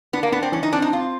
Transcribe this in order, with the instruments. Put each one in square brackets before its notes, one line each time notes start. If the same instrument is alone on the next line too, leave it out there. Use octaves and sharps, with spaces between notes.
[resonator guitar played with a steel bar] B3 [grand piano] D4
[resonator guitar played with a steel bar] A#3
[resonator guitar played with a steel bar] B3 [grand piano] D4
[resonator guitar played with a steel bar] C4
[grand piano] E3 [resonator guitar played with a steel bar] C#4
[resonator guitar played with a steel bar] D#4
[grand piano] C4 [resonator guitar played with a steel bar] D4
[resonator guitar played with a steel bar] D#4
[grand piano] C4 [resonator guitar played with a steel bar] F4